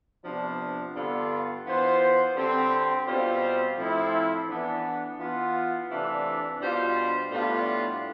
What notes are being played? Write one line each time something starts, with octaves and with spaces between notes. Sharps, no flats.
C3 F3 B3 D4
G2 D3 G3 B3 F4
E3 B3 F4 C5
D3 G3 C4
B2 G3 C4 F4 C5
A2 F3 C4 E4
E3 B3 D4
E3 B3 F4
C3 E3 A3 D4
B2 G3 D4 F4 C5
A2 G3 B3 D4 F4